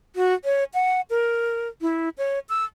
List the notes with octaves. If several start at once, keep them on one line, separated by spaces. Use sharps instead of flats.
F#4
C#5
F#5
A#4
E4
C#5
E6